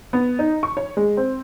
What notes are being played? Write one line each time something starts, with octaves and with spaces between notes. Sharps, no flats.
B3
D#4
C#6
C#5
G#3
C4